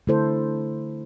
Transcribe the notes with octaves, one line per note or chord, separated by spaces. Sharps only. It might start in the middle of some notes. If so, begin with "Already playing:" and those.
D3 A3 E4 A4 C5